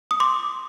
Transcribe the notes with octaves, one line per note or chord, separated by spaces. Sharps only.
D#6
C6 D6